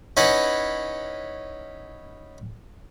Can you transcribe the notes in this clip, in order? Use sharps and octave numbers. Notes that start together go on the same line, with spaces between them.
C#4 D#4 E4 B4 F#5 G#5